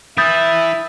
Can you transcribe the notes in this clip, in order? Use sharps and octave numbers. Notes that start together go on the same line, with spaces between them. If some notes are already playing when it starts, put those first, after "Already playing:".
E3 E4 E5 D#6 G6 A6